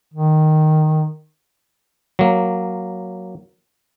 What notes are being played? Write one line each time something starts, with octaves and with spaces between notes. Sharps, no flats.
D#3
F#3 A#3